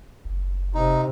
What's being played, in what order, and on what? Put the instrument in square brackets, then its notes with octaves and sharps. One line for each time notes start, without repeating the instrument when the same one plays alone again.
[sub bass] F#1
[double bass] C3 [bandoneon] D#4